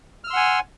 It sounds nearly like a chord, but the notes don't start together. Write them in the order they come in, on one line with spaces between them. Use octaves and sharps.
F6 E6 C6 F#5 G#5